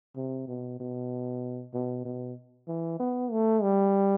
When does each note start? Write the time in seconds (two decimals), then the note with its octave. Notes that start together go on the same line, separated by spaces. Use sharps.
0.16 C3
0.48 B2
0.80 B2
1.74 B2
2.05 B2
2.68 E3
3.00 B3
3.31 A3
3.62 G3